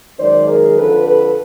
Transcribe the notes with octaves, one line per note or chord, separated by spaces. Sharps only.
F#2 D#3 G#3 C5 D5
G#4 A#4
F2 D3 F3 A4 B4
A4 B4